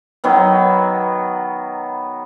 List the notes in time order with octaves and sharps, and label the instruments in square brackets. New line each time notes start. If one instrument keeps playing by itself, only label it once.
[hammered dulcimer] D#3 F#3 B3